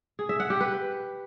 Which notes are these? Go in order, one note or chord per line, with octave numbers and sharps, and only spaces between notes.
G#4
E5
F#5
G4
B4